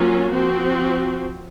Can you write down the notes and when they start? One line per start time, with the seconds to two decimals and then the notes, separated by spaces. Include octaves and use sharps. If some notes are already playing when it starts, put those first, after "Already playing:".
Already playing: F#3 A#3 C#4 F4
0.31 F3 C4 F#4